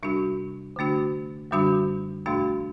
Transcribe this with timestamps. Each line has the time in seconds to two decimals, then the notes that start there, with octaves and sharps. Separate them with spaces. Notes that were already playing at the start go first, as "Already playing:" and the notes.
0.03 C3 G3 D4 F#4
0.76 D3 A3 D4 F#4
1.51 F#2 D3 G3 D4 F#4
2.26 E2 B2 A3 D4 F#4